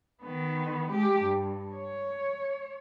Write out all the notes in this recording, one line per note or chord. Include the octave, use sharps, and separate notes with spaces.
D#3 B3
G#3 G4
G2
C#5